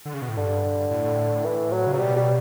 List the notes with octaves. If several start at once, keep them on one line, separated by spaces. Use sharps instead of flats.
D3
C#3
B2
A2
G2 D3
A2
E3
F#3
C#3
F#3
B2 G3
G3